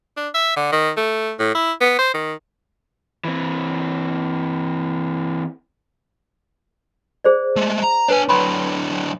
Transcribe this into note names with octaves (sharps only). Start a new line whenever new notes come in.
D4
E5
D3
D#3
A3
A2
E4
B3
C5
D#3
E3 C4
G#4 C5 D5
G#3 A3
A#5
D4 B4 C#5 G#5
D3 F#3 G5 B5 C6